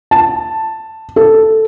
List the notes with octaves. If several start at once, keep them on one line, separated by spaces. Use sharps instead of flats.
A5
A4